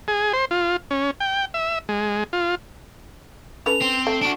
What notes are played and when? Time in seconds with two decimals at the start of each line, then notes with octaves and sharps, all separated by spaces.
0.08 G#4
0.33 C5
0.51 F4
0.91 C#4
1.20 G5
1.54 E5
1.89 G#3
2.33 F4
3.66 C#4 A4 B4 F7
3.81 C4
4.07 A3
4.22 D4 F#4 D7